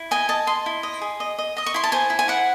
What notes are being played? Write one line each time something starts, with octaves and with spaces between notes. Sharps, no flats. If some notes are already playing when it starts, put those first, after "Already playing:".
Already playing: E4
D#5 G#5
D#5 A5
D#5 C6
E4
D#5
G#4
D#5
D#5
D#5 D#6
C#6
E4 C6
A5
C5 G#5
E4
G#5
E4 F#5